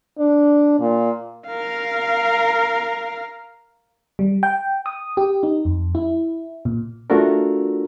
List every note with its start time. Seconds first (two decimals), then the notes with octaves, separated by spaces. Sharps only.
0.19 D4
0.80 A#2
1.48 A#4 F5
4.19 G3
4.43 G5
4.86 D#6
5.17 G4
5.43 D#4
5.65 F2
5.95 E4
6.65 A#2
7.10 A3 D4 F4 F#4 A4 A#4